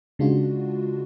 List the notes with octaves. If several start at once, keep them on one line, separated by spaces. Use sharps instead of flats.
C#3 G#3 D4 F4 F#4